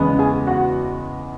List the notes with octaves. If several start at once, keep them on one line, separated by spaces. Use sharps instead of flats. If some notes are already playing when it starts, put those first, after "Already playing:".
Already playing: E2 C#3 G#3 B3
G#4 G#5
F#4 F#5